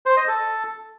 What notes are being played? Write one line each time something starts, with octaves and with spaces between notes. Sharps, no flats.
C5
D#5
A4